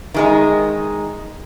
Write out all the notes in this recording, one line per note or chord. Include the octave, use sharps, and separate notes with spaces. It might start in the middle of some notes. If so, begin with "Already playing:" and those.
D#3 G#3 D#4